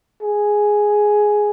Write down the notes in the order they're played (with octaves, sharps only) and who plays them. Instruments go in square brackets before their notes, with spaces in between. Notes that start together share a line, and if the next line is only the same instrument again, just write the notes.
[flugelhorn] G#4